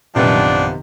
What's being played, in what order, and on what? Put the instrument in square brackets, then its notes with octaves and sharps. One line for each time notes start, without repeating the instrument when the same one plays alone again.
[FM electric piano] A#1 F#2 [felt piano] C3 D#3 [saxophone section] F3 B3 [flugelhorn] D4